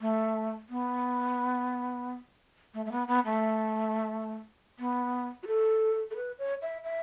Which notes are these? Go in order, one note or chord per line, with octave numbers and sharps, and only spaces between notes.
A3
B3
A3
A3
B3
B3
A3
B3
F#4
A4
A4
B4
C#5
E5
E5